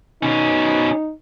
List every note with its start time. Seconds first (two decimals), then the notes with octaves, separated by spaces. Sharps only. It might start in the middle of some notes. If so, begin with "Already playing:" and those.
0.23 B2 C#4 D#4